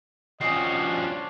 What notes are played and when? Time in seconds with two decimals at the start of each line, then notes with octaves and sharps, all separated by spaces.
0.41 F3 G3 A#3 C#4 F#4 D#5 C7
0.76 D4